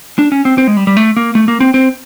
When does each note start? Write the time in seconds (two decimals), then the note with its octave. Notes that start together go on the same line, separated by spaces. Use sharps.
0.19 D4
0.32 C#4
0.45 C4
0.58 C4
0.67 G#3
0.77 G3
0.87 G3
0.97 A3
1.17 A#3
1.35 A3
1.48 A#3
1.60 C4
1.74 C4